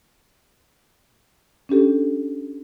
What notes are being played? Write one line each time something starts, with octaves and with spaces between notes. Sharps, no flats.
C#4 D4 G4 A4